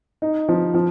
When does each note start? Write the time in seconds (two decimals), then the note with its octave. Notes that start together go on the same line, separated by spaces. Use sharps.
0.22 D#4
0.49 F3
0.74 F3